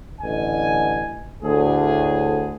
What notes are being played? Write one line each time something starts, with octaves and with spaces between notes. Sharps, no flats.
A1 D3 D#5 G#5
D2 A2 G#4